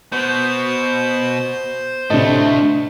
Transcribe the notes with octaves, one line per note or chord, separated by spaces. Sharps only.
B2 C5
D2 A2 C3 A3 D4 D#5